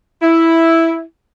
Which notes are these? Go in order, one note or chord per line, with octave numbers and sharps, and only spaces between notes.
E4